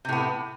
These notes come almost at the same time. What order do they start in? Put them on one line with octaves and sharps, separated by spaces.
C3 A2 B3